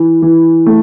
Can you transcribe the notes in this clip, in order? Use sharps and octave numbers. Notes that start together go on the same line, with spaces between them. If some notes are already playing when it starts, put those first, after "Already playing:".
Already playing: E3
E3
A3